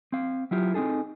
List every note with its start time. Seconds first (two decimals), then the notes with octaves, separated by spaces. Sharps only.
0.12 C4 F5
0.51 F#3 E4 F4 G4
0.74 C4 C#4 D#4 G#4 A4